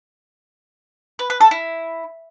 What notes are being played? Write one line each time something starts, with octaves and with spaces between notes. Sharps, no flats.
B4
B4
A4
E4